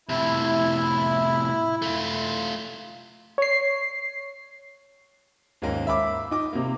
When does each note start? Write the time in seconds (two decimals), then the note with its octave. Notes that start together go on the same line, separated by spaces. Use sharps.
0.09 A2 C3 E4
1.82 A3 F4
3.38 C#5 C7
5.62 D#2 G#2 A#3 C#4
5.87 E5 B5 D6
6.31 D#4 D6
6.53 C3 A#3